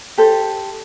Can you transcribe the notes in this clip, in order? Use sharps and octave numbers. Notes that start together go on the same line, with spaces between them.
G4 A4 C5